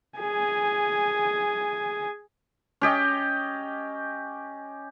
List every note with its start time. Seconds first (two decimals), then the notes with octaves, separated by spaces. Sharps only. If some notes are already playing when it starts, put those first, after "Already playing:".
0.19 G#4 G#5
2.81 C#4 G4 D#5